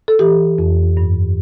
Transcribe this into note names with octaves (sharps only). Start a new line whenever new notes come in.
A4
E3 G4
F2
G2